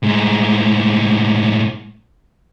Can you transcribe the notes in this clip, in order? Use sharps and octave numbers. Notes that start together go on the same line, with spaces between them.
A2 G#3